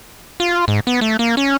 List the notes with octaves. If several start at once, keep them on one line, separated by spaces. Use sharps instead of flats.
F4
G#2
B3
A3
A#3
C#4